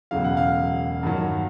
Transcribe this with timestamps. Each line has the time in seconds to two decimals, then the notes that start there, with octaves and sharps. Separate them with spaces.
0.11 E1 E2 C#3 F#3 F5
0.24 F#5
0.37 F5
1.03 G2 D#3 F#3